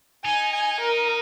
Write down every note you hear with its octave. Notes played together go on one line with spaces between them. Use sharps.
D#4 G#5
G#5
A#4